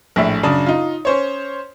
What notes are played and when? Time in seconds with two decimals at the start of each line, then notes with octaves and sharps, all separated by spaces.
0.16 A#1 A2 E5
0.43 F#2 C#3 D4 D#6
0.66 D#4 F4
1.05 C#4 C5 C#5